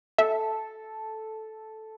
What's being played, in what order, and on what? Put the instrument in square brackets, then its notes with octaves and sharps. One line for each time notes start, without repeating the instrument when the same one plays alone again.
[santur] A4 [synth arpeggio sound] E5